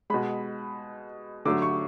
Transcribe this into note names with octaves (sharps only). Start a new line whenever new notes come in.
B2 G#3 B5
D3 F#3 A3 D6
C#6